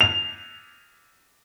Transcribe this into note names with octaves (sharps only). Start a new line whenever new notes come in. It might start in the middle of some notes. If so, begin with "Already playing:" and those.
F7